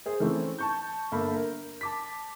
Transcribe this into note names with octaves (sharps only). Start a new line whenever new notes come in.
G#4 C5
E3 A3 C4 C#4
A5 C#6 G6
G1 A#3 A4 B5
A#4
A5 D6 B6